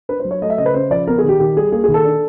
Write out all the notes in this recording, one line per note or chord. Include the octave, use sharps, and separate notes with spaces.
D4 B4
C5
F#3
C#5
A3 D#5
E5
C#3 D#5
B4
C#3 C5
F3 D5
B3 A#4
G#4
D#3
G4
D#3 G4
G3 G#4
A#3 G#4
G#4
D#3
A4
D4